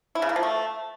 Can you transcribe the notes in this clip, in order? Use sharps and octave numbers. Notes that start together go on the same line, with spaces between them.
E4
C#3
A#3
F3
A3